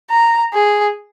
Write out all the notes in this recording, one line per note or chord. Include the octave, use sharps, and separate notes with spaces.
A#5
G#4